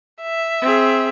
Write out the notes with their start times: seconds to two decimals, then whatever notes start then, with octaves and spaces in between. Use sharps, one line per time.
0.22 E5
0.62 C4 G#4